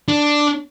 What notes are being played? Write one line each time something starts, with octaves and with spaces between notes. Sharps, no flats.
D4